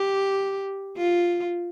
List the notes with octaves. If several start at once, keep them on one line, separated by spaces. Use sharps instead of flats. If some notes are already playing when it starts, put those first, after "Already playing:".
Already playing: G4
F4